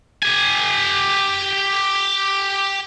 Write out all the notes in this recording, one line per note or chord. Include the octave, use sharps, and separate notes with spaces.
G4 G#5